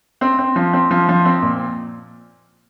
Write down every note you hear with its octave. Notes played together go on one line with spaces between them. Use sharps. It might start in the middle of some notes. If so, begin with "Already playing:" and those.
C4
C4
F3
C4
F3
F3
C4
A#2